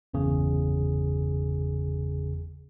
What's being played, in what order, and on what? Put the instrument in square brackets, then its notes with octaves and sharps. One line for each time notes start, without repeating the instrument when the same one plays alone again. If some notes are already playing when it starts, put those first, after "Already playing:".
[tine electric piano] G1 E2 C#3 G#4